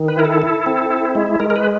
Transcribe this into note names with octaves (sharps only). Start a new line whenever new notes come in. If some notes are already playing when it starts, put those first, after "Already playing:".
Already playing: D#3
B4
E4 A#4
A4
E4
C4
E4
G#3
G#3 A#4
A#4
B4